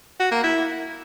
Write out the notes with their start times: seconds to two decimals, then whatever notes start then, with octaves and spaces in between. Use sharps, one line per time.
0.20 F#4
0.31 A#3
0.43 E4